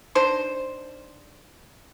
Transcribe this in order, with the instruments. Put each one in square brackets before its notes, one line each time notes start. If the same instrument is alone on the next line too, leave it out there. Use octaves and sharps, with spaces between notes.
[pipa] D4 D#4 C5